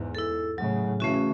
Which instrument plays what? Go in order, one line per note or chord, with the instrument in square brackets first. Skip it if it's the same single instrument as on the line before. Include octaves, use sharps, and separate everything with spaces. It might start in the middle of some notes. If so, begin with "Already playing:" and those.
Already playing: [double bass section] E2 G#2
[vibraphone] E4 A4
[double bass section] A2 C#3 [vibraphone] F#3
[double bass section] C#3 E3 [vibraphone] A3 C#4 F#4